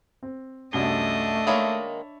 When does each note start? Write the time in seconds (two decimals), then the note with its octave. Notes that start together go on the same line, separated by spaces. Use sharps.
0.23 C4
0.73 C2 F#2 A3 D4 D#5 G7
1.47 D#3 G#3 A#3 C#5 E5 B5